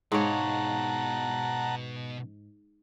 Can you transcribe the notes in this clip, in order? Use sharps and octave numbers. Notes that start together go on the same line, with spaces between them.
G#2 B2 C#5 F5 F#5 A5 A#5